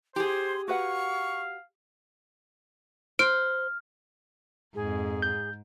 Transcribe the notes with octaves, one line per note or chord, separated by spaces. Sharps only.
G4 G#4 C5 C6
F#4 B4 F5 F#5 C#6
C5 F6 D7
F2 G#2 G#4
G6